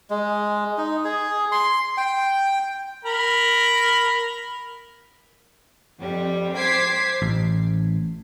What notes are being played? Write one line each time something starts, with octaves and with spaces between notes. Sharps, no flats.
G#3
D#4
G#4
C6
G5
A#4 B5
F2 G3
C5 D6 G#6 B6 C7
A1